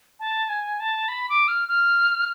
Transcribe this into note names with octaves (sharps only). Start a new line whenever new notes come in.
A5
G#5
A5
B5
D6
F6
F6